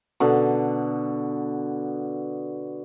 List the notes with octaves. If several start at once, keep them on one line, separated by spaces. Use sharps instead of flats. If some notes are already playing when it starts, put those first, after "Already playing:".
B2 D3